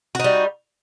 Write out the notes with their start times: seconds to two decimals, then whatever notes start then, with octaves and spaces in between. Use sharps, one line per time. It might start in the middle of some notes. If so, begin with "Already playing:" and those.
0.15 F#4
0.20 D#4
0.24 G3